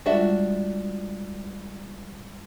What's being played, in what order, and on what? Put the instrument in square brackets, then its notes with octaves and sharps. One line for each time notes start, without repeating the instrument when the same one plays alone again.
[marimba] G3 G#3 F4 [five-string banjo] D4 F#4 E5